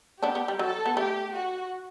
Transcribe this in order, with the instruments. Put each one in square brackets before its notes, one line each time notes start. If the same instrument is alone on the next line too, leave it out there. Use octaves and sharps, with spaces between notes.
[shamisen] B3 D4 [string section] G4
[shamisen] B3
G3
[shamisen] F#3 [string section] A4
[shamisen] B3
[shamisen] A3 [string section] G4
[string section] F#4